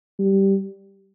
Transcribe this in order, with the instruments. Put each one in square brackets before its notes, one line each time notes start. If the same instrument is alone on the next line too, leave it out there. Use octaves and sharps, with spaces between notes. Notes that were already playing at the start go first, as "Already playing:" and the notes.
[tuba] G3